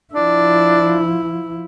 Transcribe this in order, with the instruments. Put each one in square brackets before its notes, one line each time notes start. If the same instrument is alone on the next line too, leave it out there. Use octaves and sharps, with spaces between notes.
[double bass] F3 E4 [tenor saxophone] D4